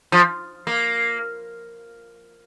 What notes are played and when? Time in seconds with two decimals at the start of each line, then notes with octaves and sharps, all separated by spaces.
0.12 F3
0.67 A#3